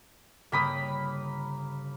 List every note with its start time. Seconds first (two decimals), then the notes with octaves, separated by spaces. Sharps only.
0.52 G1 C#3 A#3 G5 B5 D#6